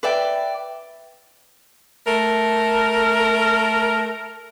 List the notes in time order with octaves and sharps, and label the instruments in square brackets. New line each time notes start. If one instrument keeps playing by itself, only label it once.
[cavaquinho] B4 D5 E5 G5
[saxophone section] A3 A#4